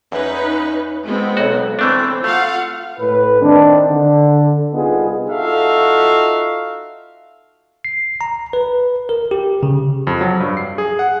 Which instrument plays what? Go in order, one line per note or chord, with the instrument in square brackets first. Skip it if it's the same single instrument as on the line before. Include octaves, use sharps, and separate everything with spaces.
[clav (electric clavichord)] E2 [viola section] C#4 D#4 B4
[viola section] G#3 B3 C4
[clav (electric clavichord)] B1 F#4
[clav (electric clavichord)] E3 A3 D4 [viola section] C4
[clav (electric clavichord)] A3 [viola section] F4 F5 F#5
[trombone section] A2 B4
D#3 C4 D4
D3
C2 B3 D#4 F4 G#4
[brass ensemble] D#4 F4 F#4 A4 E5 F5
[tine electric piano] C7
A#5
B4
A#4
G4
C#3
[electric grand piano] F2
F#3
G2
C7
G#4
F#5